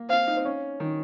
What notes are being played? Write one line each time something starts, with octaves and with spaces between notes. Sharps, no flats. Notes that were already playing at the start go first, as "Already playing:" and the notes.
Already playing: A#3
C4 F5
D#4
C4
C#4
D#3